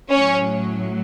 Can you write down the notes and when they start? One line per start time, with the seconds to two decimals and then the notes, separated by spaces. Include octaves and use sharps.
0.10 A2 F#3 C#4 C#5